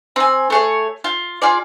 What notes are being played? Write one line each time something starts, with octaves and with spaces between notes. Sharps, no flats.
C4 G#5
A3 G#4 C#5
F4
F4 G#4 D5